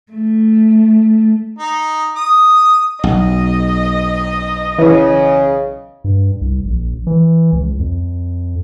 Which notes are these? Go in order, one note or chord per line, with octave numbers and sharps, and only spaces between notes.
A3
D#4
D#6
B1 D#5
C#3 E3
G2
C2
A#1
E3
C#2
F2